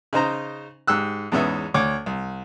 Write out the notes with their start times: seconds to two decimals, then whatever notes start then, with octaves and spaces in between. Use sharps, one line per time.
0.13 C#3 D#4 C5 A#5
0.87 G#2 G4 E6 F#6
1.32 E2 G#2 B3 C#4 E5
1.74 D2 C#5 D6
2.06 C2